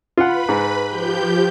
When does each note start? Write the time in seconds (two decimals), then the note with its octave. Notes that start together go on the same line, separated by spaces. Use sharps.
0.18 F4 B4 F#5 B5
0.49 G#2
0.87 F3 G4 G6